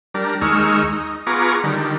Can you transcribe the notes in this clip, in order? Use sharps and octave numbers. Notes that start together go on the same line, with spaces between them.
G3 D4 A#4
D#2 G#3 D#4 C#6 E6 F6
D#4
B3 F4 G#4 A#5 C#6 D6
D3 D#3 G3